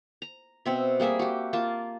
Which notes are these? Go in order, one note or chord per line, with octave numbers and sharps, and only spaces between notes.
A#5
B2 C4 E5
G3 A#3 G#4 E5
F#4 G4
A#3 F4 A5